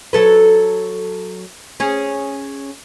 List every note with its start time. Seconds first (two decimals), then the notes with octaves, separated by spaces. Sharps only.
0.13 F#3 A4 B4
1.80 C#4 G#4